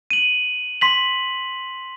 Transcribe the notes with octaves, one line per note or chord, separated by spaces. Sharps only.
D#7 F#7
C6 B6 F#7